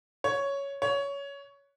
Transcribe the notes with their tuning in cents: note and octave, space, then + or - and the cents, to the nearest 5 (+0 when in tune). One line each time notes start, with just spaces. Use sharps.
C#5 +5
C#5 +15